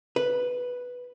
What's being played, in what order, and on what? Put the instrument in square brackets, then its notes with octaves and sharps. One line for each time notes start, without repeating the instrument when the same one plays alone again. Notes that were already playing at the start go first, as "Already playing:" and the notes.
[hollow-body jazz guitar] B4